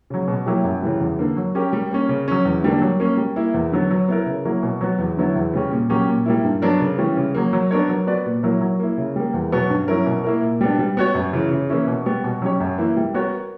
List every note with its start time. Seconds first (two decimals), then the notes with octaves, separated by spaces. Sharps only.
0.10 C#3 F#3
0.28 B2
0.46 F#3 A#3 E4 G4
0.64 F#2
0.82 C#3 E3 G3
1.01 E2
1.19 D3 A#3
1.36 F#3
1.55 C#4 G4 A#4
1.73 G3
1.91 A#3 C#4
2.09 C#3
2.28 F#3 C#4
2.45 E2
2.64 D3 G3 A#3 D4
2.82 F#3
3.00 A#3 C#4
3.17 G3
3.36 A#3 E4
3.54 E2
3.72 D3 F#3 B3
3.91 F#3
4.08 B3 E4 A#4
4.26 C#3
4.45 F#3 A#3 E4 A#4
4.63 B2
4.81 F#3 B3 F#4
4.99 E2
5.17 D3 F#3 B3 E4
5.35 E2
5.53 C#3 G3 C#4
5.71 A#2
5.90 F#3 A#3 C#4 G4
6.08 A#2
6.26 G3 A#3 E4
6.45 G2
6.62 F#3 B3 D4 A#4
6.80 C#3
6.98 E3 G3 C#4
7.17 C#3
7.35 F#3 A#3
7.53 F#3
7.71 B3 D4 A#4 C#5
7.89 F#3
8.07 B3 F#4 B4 D5
8.26 A#2
8.43 F#3 A#3 E4 A#4
8.61 F#3
8.79 A#3 E4
8.98 C#3
9.16 G3 A#3
9.34 E2
9.52 B2 F#3 B3 F#4
9.70 G2
9.88 F#3 C#4 E4 A#4
10.06 B2
10.24 A#3 E4 A#4
10.42 A#2
10.61 G3 B3 D4
10.79 G3
10.97 B3 F#4 C#5
11.15 F#2
11.33 C#3 E3
11.51 C#3
11.70 E3 A#3 C#4 E4
11.87 B2
12.06 G3 B3
12.24 B2
12.42 F#3 C#4 G4 C#5
12.60 F#2
12.78 E3 A#3 E4
12.97 G3
13.14 B3 F#4 A#4 C#5